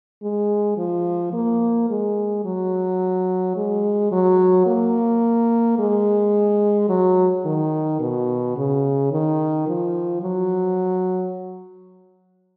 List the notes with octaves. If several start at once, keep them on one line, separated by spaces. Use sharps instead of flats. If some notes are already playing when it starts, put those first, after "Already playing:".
G#3
F3
A#3
G#3
F#3
G#3
F#3
A#3
G#3
F#3
D#3
B2
C#3
D#3
F3
F#3